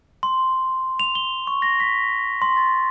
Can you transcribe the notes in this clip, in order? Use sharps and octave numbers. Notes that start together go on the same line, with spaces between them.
C6
F7
G7
C#6
A#6
B6
C6
A6